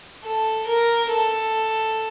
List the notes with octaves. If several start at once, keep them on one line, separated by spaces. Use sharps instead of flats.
A4
A#4
A4